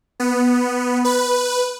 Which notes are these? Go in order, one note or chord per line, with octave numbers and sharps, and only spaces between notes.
B3
B4